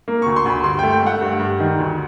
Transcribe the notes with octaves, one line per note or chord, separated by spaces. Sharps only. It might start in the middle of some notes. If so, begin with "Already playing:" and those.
A#3
D2 C#6
C6
D2 B5
G2 C6
A3 G5
G5
A3 F#5
G2
G2
D#3
D2